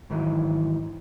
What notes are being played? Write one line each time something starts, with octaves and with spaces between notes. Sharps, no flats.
G#2 D#3 E3 F#3